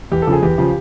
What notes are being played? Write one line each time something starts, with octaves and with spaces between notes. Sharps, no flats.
E2 G4
A4
C#3 F3
G#4
E2 G4
C#3 F3